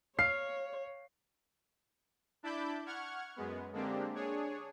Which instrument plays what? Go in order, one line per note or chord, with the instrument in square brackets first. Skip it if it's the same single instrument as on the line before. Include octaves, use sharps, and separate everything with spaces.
[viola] C#5 [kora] F5 [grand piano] C7
[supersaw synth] D4 E4 A5 B5 D6 G6
F#5 C#6 F6 G#6
F#2 G#3 B3
D3 G#3 A#3 C4 D4 G4
D4 G#4 C#5